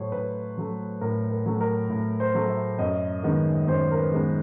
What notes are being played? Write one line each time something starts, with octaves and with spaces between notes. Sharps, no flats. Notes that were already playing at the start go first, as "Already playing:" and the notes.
Already playing: A2 F#3 A3 C5 C#5
A2 B4
F#3 A3
A2 A#4
A#4
F#3 A3
A#4
A2
C5
F#3 A3
E5
F#2 D#5
D#3 G#3 B3
F#2 C5
A#4
B4
D#3 G#3 B3